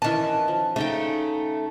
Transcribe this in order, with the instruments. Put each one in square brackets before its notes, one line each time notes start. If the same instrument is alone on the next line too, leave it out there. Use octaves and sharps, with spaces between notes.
[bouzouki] D#3 A5 [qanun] E3 C#4 B4
[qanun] F3
[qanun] C#3 D#4 G5 [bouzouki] A3